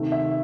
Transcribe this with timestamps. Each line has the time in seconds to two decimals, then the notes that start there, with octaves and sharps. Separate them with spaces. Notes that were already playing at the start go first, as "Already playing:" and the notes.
Already playing: C3 D#3 A3
0.12 E5